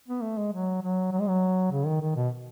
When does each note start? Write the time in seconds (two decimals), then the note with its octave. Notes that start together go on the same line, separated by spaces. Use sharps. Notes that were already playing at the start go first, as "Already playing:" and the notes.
0.08 B3
0.23 A3
0.38 G#3
0.53 F#3
0.82 F#3
1.12 F#3
1.20 G#3
1.28 F#3
1.71 C#3
1.86 D#3
2.01 D#3
2.15 B2